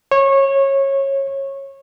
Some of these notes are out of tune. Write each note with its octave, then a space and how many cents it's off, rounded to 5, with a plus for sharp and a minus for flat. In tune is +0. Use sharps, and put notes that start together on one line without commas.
C#5 -20